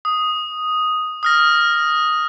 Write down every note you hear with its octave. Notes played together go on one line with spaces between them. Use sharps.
D#6
D#6 F6 A#6